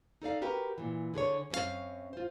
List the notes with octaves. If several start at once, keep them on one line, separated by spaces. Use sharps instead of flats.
D#4 A4 D5 F5
F#4 G4 A#4 B4
A#2 E3
D3 G#4 B4 C#5
F#2 C4 C#4 E4 F5
F4 C5